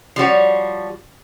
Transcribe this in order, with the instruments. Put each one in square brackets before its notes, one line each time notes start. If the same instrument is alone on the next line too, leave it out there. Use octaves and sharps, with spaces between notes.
[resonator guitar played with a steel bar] F3 G3 F#4 C#5